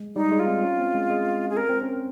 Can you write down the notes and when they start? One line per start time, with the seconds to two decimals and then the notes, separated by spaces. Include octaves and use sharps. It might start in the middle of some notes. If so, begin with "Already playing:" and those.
Already playing: G#3
0.16 G3 D#4
0.31 G#3
0.40 F4
0.47 C4
0.63 C#4
0.79 C4
0.94 G#3
1.10 G#3
1.50 G#4
1.57 C4 A#4
1.69 C4
1.81 C#4
1.93 C4